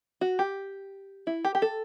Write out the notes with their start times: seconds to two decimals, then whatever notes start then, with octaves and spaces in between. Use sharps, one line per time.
0.21 F#4
0.39 G4
1.27 E4
1.44 G4
1.55 G4
1.62 A4